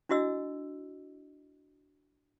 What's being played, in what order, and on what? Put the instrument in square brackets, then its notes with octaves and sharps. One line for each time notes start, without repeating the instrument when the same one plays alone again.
[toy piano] D4 E4 F#4 D#5 E6